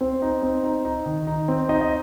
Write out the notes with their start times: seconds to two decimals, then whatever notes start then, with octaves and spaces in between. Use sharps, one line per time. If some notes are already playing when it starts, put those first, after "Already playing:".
0.01 C4 C5
0.22 D#4
0.43 C4
0.64 D#4
0.85 D#4
1.06 D#3
1.27 D#4
1.48 C4
1.69 D#4 D#5
1.81 D#5